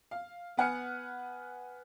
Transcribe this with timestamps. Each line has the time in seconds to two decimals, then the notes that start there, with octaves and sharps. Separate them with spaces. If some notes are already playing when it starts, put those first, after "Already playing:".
0.11 F5
0.57 B3 B4 F#5 G#5 F6 C#7